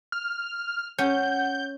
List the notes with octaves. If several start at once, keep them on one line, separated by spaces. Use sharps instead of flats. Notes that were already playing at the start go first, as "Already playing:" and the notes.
F6
C#4 F#5 G6